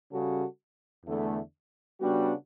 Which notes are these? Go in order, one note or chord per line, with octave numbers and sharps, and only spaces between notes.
C#3 G3 C#4 F#4 A4
E2 D3 A3
C#3 G3 B3 D4 F#4